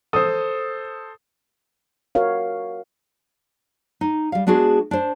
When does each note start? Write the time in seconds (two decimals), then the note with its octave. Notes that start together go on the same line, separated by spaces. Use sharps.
0.13 A4 C5 D#6
2.15 F#4 A#4 C#5 F5
4.01 D#4
4.32 G3 F5
4.47 G#3 B3 D4 F#4 G#4
4.91 D4 C5